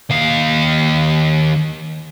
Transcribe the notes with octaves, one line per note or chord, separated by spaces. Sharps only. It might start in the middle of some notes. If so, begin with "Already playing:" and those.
D#2 F5